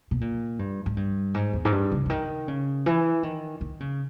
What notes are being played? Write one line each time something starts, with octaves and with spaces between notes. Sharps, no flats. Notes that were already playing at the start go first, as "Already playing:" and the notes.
B2
A#2
G2
G#2
G2
G#2
E2
G#2
G2
C#3
C#3
D#3
C#3
E3
D#3
D#3
C#3